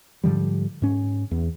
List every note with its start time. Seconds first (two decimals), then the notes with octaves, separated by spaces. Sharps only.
0.24 G#2 D3 F3 G3
0.82 G#2 C#4
1.31 E2